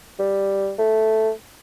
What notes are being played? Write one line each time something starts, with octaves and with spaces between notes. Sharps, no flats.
G3
A3